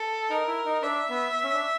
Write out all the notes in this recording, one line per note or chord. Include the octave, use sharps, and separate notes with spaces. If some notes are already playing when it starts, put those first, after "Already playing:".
Already playing: A4
D#4 A#4
E4
D#4
D4 E5
B3
C#4
D4